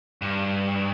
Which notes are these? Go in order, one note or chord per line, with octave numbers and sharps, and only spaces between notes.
G2